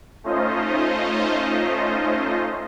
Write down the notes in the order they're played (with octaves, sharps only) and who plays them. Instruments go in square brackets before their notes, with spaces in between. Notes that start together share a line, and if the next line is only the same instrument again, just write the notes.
[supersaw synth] A3 C#4 D#4 F4 C5 D#5